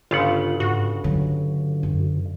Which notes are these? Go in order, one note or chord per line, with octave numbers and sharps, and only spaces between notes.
G1 C#3 F4 F#5
G#2 F#4
D3 F#3
F#2